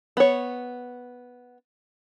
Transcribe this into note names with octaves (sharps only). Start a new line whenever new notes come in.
B3 C#5